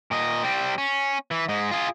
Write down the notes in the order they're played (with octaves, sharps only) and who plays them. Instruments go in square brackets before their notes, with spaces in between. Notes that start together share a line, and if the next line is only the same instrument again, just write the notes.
[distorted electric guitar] A#2 D#5
G3 C4
C#4
E3
G#2 G#3
F4 G#4